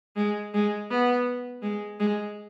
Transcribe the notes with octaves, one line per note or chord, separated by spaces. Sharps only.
G#3
G#3
B3
G#3
G#3